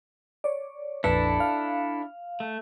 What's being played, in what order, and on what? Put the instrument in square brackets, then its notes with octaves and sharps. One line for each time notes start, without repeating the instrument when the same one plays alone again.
[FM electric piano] C#5 D5
[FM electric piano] A#1 F2 B4 [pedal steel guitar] D4 E4 A4
[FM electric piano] F5
[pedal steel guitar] A3